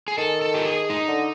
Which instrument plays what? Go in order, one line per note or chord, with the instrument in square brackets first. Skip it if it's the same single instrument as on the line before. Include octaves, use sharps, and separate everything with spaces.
[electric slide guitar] G#4
[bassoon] D#3 [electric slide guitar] A4
[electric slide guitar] A4
G4
G#4
D#4
[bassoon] D3